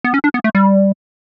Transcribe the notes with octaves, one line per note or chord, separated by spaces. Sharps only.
B3
C#4
D4
B3
A3
G3